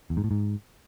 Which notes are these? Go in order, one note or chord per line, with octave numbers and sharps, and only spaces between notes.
E2
G#2
A2
G#2